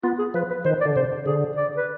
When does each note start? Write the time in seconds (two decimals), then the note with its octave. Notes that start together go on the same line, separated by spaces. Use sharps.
0.04 B3 F4
0.19 G#4
0.34 F3 B4
0.50 B4
0.65 D#3 C5
0.81 D5
0.85 D3
0.96 C3 C5
1.26 D3 G#4
1.57 D5
1.77 B4